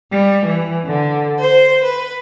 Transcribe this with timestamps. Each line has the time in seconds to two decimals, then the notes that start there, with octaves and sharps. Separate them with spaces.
0.12 G3
0.46 E3
0.86 D3
1.39 C5
1.84 B4